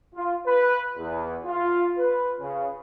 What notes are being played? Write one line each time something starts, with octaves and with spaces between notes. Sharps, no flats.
F4
B4
E2
F4
B4
C#3